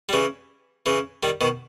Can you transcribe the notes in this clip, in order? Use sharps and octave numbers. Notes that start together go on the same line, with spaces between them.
G3
C#3 E3
C#3 E3
D#3 G3
B2 D#3